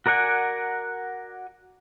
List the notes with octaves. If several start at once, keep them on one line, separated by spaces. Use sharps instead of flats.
F#4 A#4 D5 F#5 G#5